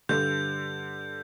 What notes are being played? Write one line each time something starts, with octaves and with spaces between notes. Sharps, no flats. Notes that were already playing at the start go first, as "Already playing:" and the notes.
G2 D3 G6